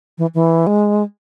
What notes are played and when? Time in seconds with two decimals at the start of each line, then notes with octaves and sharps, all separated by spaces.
0.18 E3
0.35 E3
0.67 G#3